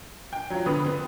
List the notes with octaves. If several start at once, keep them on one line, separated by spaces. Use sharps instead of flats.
G5
F3 F#3
D3 B3 B5 D#6
B3 C4